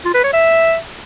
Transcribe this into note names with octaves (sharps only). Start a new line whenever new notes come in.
F4
B4
C#5
E5